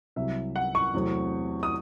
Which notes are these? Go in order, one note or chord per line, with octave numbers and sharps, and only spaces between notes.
C2 C3 F#3 E5
F#5
C#6
E2 C3 F#3 A3 C4
D#6